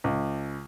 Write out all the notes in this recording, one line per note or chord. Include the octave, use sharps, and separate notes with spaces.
C#2